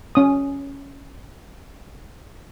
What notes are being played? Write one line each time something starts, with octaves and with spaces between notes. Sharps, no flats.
C#4 D#6